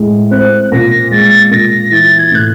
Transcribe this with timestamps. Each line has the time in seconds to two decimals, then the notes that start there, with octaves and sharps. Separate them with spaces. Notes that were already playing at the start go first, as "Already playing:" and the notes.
Already playing: A2 G#3
0.31 C4 F#6
0.72 A#2 A#6
1.11 G#3 A6
1.51 A#2 A#6
1.91 E3 A6
2.18 G#6
2.32 A2 F#6